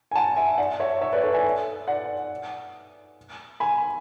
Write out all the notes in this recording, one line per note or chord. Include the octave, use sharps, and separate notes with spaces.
G#5
F#5 A5
E5 G#5
D5 F#5
C#5 E5
C#5 E5
B4 D5
A4 C#5
E5 G#5
D5 F#5
G#5 B5